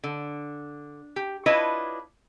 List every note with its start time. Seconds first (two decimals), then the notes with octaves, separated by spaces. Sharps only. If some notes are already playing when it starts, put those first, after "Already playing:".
0.04 D3
1.16 G4
1.46 D4 E4 F4 B4 C#5 D#5